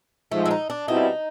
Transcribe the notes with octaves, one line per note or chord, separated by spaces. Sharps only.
G#2 F3 G#3 A3
E4
D#4
D4
B2 G3 C4 D#4 E4